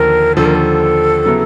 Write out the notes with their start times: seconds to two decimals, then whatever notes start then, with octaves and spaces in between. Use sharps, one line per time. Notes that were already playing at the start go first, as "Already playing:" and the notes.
Already playing: D#2 D3 F3 A#4
0.37 D#2 D3 F3 A4
0.45 A#4
0.55 A4
1.26 C#3 F#3 B3 E4